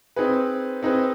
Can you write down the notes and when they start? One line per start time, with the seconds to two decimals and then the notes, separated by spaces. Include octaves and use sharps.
0.16 C4 D#4 G#4 B4
0.83 C4 D#4 G#4 B4